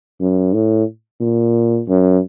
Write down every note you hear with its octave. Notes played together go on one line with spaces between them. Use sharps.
F#2
A2
A#2
F#2